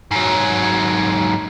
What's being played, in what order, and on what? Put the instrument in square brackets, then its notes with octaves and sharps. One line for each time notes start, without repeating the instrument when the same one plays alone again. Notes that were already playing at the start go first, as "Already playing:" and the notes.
[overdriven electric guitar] G#2 F#3